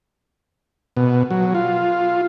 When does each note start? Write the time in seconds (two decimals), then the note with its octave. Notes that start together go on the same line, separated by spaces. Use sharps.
0.97 B2
1.31 F#3
1.55 F4